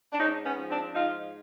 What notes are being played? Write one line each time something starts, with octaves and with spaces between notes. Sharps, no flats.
D4
G#2 C#4 D#4
B3 C#4
F3
C4 D4
G#2 D#4 F4